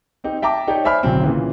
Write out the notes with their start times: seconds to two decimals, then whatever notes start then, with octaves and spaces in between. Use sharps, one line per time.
0.24 C4 D#4 G4
0.42 E5 G5 A5 A#5 D6
0.67 D#4 G4 C#5 D5
0.84 C5 D5 E5 G#5 B5 F6
1.03 D1 B1 F#3 C4
1.24 A#2 C#3 E3